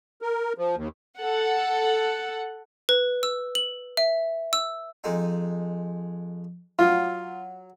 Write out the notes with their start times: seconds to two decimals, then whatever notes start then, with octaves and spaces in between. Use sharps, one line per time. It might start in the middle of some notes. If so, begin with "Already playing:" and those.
0.22 A#4
0.58 F3
0.76 D#2
1.18 A4 F#5
2.89 B4
3.23 E6
3.55 F#7
3.97 E5
4.53 E6
5.04 F2 G#3 D#4
6.79 F#3 F4